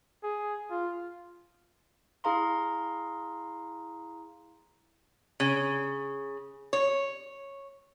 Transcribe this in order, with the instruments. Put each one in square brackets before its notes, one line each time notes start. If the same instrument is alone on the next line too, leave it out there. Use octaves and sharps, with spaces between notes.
[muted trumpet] G#4
F4
[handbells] E4 G#4 F5 A#5 C6
[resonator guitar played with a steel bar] C#3
C#5